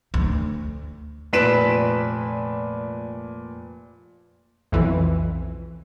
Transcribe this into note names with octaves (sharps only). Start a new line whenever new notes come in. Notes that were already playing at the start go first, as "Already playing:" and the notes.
D2
F1 A#2 B4 B6 D7 E7
B1 F2 E3